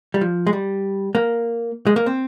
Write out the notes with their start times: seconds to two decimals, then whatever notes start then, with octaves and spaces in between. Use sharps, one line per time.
0.14 G3
0.21 F3
0.47 G#3
0.53 G3
1.15 A#3
1.87 G#3
1.96 A#3
2.06 C4